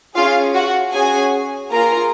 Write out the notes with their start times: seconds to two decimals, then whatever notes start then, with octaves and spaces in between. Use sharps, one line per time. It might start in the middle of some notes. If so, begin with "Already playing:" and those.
0.15 C#4 F4 G#4 F5
0.55 F#4 F#5
0.93 C#4 F#4 G#4 G#5
1.71 A#3 F4 G#4 A#4 A#5